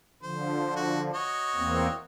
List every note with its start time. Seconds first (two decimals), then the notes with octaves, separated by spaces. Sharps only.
0.23 D3 F3 C5
0.76 F#4
1.14 F#4 C#5 D#5
1.55 E2 A#3 C4